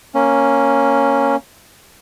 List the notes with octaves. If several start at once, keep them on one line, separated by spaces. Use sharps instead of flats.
A#3 C#4